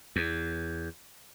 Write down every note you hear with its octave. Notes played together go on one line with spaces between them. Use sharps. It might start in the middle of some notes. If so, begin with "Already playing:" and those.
E2